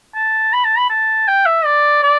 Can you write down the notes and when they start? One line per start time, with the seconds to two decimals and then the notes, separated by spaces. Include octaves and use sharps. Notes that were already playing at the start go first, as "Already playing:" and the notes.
0.15 A5
0.53 B5
0.65 A5
0.78 B5
0.90 A5
1.28 G5
1.46 E5
1.65 D5
2.03 D5